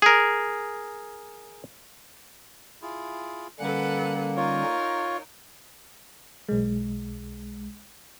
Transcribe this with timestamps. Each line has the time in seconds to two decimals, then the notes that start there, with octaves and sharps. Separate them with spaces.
0.02 G#4 A#4
2.82 E4 F4 G#4
3.60 D3 G3 A#3 C#4 A4 B4 F#5
4.37 D#4 F4 A#4 C#5
6.49 B1 G#3